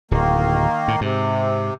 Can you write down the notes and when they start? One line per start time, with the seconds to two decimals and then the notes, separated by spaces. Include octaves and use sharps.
0.11 D1 D#3 A#3
0.88 A2
1.01 G#2 C3